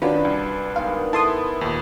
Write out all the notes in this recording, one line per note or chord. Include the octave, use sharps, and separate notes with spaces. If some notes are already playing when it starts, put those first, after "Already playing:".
D#3 C#4 D4 F4 F#4 B4
C2
D#3 G#3 B3 F5
E4 A4 A5 C6 D#6
D#2 A#2